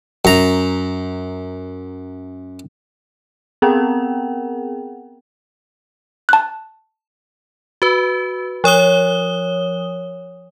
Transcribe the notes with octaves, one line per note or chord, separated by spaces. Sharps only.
F#2 A#5
B3 C4 G#4 A#4 F#5 G5
A5 F#6
F#4 B4
F3 C#5 D#6 G7